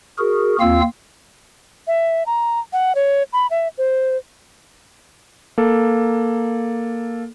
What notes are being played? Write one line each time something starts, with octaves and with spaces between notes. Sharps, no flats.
F#4 G#4 A#4
D#2 A#3 C4 F4 F5 E6
E5
A#5
F#5
C#5
B5
E5
C5
A#3 A4